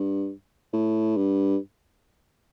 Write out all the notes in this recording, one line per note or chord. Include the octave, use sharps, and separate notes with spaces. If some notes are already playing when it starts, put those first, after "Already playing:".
Already playing: G2
A2
G2